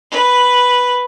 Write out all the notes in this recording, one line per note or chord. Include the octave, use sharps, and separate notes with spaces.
B4